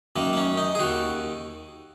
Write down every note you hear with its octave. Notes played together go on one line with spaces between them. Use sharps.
F#2 D#3 A#3
A#3
C#4
D#4
G#4
D#2 D#3 F#4